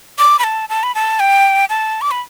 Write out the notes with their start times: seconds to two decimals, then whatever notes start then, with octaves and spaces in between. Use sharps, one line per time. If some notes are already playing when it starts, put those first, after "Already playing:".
0.19 D6
0.39 B5
0.44 A5
0.69 A5
0.83 B5
0.95 A5
1.20 G5
1.70 A5
2.01 D6
2.11 B5